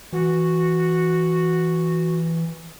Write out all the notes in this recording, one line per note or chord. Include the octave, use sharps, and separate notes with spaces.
E3 F#4